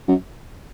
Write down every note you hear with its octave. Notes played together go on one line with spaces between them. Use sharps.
F#2